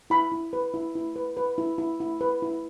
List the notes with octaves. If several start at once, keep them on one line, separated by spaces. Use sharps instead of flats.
E4 B5
E4
B4
E4
E4
B4
B4
E4
E4
E4
B4
E4